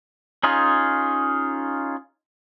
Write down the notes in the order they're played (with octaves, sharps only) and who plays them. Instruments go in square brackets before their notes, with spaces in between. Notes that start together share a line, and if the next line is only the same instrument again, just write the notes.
[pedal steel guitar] C#4 D#4 F4 G#4